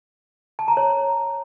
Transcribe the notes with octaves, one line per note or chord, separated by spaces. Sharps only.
A5
A#5
C#5